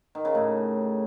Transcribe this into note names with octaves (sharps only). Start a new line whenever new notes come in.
D#3
C#3
A2